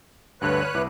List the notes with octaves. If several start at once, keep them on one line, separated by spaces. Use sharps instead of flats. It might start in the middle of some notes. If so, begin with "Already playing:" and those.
D2 G2 D3 B4 C#5 F#6
F6 D#7
C2 E4 D6